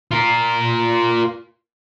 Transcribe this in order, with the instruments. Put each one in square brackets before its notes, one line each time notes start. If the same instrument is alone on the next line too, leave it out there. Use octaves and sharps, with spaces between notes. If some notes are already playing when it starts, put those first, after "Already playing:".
[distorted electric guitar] F4 A#4